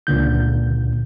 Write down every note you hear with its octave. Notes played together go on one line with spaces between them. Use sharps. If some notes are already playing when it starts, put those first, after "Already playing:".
C#2 A#2 D3 G6